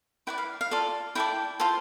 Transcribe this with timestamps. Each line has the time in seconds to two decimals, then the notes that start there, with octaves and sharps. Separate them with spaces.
0.27 E4 B4 D5 G5
0.38 F5
0.61 F5
0.71 F4 A4 D5
1.15 E4 A4 D5 G5
1.60 F4 A4 C5